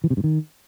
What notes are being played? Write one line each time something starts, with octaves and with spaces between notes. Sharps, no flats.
E3
C3
G2
D#3